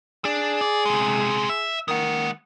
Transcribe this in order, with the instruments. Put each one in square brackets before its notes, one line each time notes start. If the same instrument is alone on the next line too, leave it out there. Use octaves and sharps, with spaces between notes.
[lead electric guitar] D4 [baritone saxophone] G#4
[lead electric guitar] D5
C3 G#3
E5
[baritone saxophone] D#3 [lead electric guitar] G#3 F#5